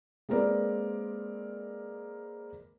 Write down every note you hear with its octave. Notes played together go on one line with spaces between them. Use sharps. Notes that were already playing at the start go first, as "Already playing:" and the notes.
G#3 A#3 C4 A#4 B4 D5